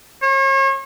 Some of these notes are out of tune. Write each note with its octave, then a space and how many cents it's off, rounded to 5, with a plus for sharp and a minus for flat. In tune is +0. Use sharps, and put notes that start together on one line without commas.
C#5 -40